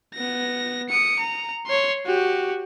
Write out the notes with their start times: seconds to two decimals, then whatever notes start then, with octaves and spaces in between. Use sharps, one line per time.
0.14 B3 A#6
0.89 D#6 C#7
1.19 A#5
1.67 C#5 C6
2.06 F#4 G4